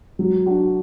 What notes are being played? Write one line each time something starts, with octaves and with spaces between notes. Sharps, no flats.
F#3
D4 F#4